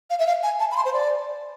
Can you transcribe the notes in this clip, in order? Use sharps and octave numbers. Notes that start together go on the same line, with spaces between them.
F5
E5
F5
G#5
A5
B5
C6
C5
D5